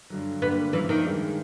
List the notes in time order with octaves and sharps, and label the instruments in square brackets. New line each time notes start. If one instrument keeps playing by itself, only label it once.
[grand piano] G2 D3 F#3
[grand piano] G2 D3 G3 A#3 [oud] B3
[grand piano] G2 D3 F3 A#3 D4 [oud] E3
[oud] D#3
[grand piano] G2 D#3 G#3